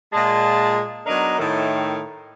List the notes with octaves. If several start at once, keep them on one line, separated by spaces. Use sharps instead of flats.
A#2 G#3 A5
F#3 B3 D4 D#4 A#4 D#5
A2 D#3